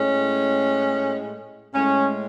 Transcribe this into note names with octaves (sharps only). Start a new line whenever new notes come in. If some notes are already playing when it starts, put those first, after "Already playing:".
Already playing: A2 G#3 C#4
A2 G#3 C#4